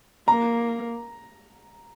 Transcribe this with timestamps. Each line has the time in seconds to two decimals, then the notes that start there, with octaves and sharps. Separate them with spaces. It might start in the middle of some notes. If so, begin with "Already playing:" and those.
0.28 A#3 A#5